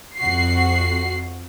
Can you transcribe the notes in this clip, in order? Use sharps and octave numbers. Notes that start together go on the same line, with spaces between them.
F2 F#4 C7